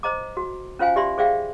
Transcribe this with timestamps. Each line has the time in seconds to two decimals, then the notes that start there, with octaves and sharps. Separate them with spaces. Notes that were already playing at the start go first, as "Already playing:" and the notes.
0.03 C5 D#5 A#5 D6
0.37 F#4
0.79 C#4 F4 C5 F5 G#5
0.96 G4 D5 E5 B5 C6
1.18 G#4 C5 D5 E5 F5 G5